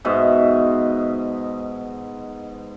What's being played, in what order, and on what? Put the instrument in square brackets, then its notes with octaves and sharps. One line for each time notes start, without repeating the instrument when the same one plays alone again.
[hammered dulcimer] G#2 B2 D#5 E5